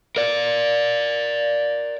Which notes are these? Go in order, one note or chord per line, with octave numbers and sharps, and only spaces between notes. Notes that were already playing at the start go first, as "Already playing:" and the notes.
A#4 D5